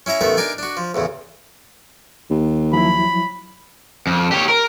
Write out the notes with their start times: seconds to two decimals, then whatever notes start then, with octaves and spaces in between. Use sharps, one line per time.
0.06 C#4 E4 E5 A#5
0.21 A1 D#3 A3 B3 E5
0.37 D4 D#4 A#4 D5 G#5
0.58 D4 F#4
0.77 F3
0.94 A1 E2 C#3
2.30 D#2
2.73 F3 F#3 E4 B5
4.07 F2
4.32 G4 C#5
4.48 A#4